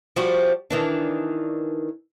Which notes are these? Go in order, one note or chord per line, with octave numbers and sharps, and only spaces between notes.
F3 G3 F#4
D#3 E3 D4